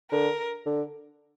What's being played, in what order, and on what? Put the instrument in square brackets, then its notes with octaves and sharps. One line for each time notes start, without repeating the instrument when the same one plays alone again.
[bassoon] D3 [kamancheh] A#4
[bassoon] D3